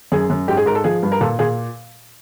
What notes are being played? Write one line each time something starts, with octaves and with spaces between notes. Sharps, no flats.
F#2 G#4
F#2
G#2 G4
G#4
G#2 A#4
A4
F3 G#4
G2
A#4
A#2 A4
A#2 G#4